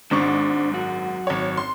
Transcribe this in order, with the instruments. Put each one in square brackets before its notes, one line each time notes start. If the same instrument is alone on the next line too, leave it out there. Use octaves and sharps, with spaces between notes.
[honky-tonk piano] G#1 G#2 C#6 [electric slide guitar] D4 C5
[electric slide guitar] F#2 F#4
[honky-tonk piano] G#1 C#5
C6